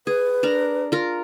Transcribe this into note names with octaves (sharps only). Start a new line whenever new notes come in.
G#4 B4
D4 A#4 A#5
F4 A#4